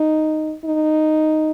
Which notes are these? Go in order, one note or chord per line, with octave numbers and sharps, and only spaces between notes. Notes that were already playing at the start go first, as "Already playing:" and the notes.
Already playing: D#4
D#4